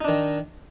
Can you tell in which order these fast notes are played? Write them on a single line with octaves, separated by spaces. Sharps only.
D#4 D4 D#3